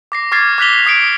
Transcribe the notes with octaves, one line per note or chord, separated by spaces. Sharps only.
D6 A#6 C7
C#6 D6 F6 G#6 A6 C7
D6 F#6 A#6 B6 F7 G7
D6 D#6 C7 D7